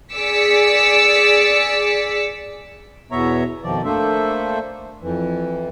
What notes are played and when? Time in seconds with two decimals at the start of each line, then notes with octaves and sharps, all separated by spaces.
0.15 G#4 D5 D6 E6 B6 C#7
3.11 E2 B2 B3 C#5 E5 A#5
3.63 F2 B2 D#3 F3 D5
3.84 A3 A#3 D4 A4 C5 E5
5.02 F2 E3